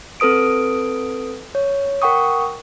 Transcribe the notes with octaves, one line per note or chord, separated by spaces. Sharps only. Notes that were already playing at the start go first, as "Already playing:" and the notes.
C4 A4 B4 D#6 D7
C#5
A#4 F#5 G5 C#6 D#6